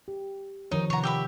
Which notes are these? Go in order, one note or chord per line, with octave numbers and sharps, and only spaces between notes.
G4
D#3 F3 D#4 C#5
C3 C#5 F#5 A#5
G4 E5 B5